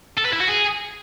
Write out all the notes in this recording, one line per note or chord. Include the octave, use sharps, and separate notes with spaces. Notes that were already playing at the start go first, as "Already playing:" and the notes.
A4
B4
E4
F#4
G#4